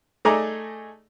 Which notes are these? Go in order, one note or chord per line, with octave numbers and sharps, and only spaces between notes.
A3 D#4 G#4 A4 D5 A#5